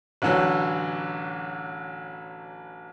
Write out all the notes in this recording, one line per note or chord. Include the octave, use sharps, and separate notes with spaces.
A1 D3 E3 F#3